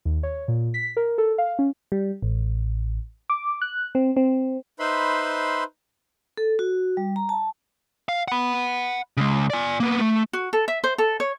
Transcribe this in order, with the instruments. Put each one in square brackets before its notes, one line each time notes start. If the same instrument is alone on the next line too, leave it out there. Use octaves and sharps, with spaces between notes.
[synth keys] D#2
C#5
A#2
B6
A#4
A4
F5
C#4
[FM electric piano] G3
A1
D6
F#6
C4
C4
[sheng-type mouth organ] D#4 B4 C5 E5 B5 C6
[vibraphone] A4
F#4
G3
A#5
A5
[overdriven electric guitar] F5
F#5 B5
C#3 G#3
D5 G#5
A#3 B3
A3
[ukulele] F#4
A4
E5
C5
A4
C#5